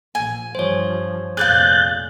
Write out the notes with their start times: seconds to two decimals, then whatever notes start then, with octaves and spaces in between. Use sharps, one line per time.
0.15 A#1 G#5
0.55 G2 F3 C5 C#5
1.37 F1 A#1 G#4 D5 F5 F#6 G6 A6